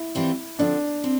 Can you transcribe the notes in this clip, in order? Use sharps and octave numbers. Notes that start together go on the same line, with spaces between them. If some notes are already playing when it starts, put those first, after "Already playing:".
Already playing: E4
E3 G3 C4 F4
D3 F3 C4 D4
C4